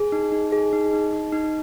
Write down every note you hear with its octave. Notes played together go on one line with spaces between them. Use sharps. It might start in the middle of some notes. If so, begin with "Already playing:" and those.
Already playing: G#4
D#4
D#4
G#4
D#4
D#4
D#4
D#4